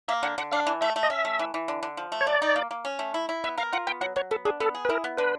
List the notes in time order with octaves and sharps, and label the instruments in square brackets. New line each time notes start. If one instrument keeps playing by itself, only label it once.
[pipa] A#3 [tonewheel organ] E5
[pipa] D3 [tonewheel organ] F#5
[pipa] D3 [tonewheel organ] F#5
[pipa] D4 [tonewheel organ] F5
[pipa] E3
[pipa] A3 [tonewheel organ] E5
[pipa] A3
[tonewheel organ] D#5
[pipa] C#4 [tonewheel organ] E5
[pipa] A3
E3
E3
D3
D3
F3
A3
[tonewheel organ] C#5
[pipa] F#3 [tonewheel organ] D5
[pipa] D#4
A#3
A#3
C#4
A3
E4
E4
[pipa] B3 [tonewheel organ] E5
[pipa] A#4 [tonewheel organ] F5
[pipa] F4 [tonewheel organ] F#5
[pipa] B3 [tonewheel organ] G5
[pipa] F#3 [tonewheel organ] F#5
[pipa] F#3 [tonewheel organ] C#5
[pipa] B3 [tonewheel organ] A4
[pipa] D4 [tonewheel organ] G#4
[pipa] B3 [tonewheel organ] A4
[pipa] G#4
[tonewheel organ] B4
[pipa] E4 [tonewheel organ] A#4
[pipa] B3
[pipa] D3 [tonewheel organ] B4